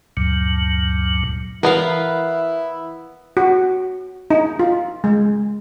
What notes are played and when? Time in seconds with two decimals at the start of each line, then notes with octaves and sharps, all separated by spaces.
0.17 D2 G2 A#2 F#3
1.63 E3 B3 E4 A#4 B4 F5
3.37 F#4
4.30 D#4
4.59 F4
5.04 G#3